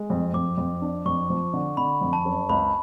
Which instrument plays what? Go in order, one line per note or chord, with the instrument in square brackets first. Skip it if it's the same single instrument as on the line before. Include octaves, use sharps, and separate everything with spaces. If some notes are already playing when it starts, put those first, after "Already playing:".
Already playing: [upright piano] G#3
F2
[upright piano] F2 [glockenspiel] D6
[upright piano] F2
D4
[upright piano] F2 [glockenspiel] C#6
[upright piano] F3
D3
[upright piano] D3 [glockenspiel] B5
[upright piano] F2
[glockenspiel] A5
[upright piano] F#1
[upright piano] C#2 [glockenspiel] B5